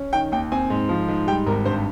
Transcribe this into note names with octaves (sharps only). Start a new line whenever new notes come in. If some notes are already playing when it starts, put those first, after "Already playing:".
Already playing: C#4
D#3 G5
D#2 G5
C4 G#5
G#2
F3
G#2
G3 G5
G#1 A#4
G2 C5